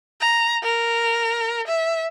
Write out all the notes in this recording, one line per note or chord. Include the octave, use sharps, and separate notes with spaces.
A#5
A#4
E5